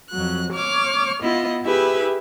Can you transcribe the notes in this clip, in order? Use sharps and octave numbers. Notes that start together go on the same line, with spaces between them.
F2 F#3 F#6
C#5 D6 F6
B3 E4 F4 D#5
E4 G4 G#4 B4 E5